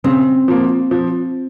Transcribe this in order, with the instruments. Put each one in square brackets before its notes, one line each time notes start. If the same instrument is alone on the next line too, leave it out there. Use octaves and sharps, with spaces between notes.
[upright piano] C#3 [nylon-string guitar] C4
[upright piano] F3 A#3
F3